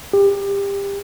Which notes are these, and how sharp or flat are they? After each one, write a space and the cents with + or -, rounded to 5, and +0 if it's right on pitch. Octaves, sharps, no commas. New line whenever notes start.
G4 +25